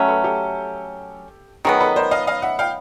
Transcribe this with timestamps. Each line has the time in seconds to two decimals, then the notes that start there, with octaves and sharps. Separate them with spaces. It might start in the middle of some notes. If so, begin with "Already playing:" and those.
Already playing: F#3 A3 C#4
0.08 A4 B4
0.24 G4 A4
1.65 D#3 F#3 B3 G#4 A#4
1.80 A4 B4
1.96 A#4 C5
2.11 D#5 F5
2.27 D#5 F5
2.42 E5 F#5
2.59 F5 G5